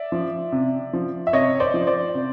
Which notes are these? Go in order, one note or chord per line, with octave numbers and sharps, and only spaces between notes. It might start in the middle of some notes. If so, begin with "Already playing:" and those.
Already playing: D5 E5
F3
C3
F3
E5
C3 C#5 D#5
C5 D5
F3
C5 D5
C3